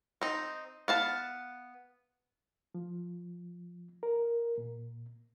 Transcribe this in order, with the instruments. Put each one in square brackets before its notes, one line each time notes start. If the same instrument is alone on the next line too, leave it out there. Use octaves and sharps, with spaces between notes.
[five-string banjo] C4 D#4
B3 F5 A5
[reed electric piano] F3
A#4
A#2